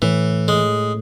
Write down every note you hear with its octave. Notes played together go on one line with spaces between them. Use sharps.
A2 E3
G#3